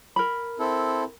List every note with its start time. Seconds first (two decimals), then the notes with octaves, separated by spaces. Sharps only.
0.16 A#4 B5
0.59 C4 E4 A4